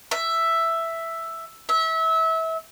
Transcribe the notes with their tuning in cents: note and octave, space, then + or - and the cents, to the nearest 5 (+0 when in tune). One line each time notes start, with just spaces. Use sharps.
E5 +5
E5 -25